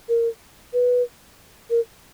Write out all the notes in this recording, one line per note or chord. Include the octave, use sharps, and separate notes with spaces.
A#4
B4
A#4